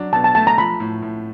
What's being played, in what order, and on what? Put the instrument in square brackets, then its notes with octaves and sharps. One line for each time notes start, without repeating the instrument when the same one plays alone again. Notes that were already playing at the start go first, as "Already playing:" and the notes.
Already playing: [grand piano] F#3 D4
[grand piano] B2 [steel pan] A5
[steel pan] A5
[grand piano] A3 [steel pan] A5
[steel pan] A#5
[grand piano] F3 [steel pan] B5
[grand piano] A2
A2